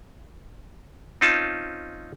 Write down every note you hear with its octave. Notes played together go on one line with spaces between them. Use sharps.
C4 C#4 D#4 F4 A5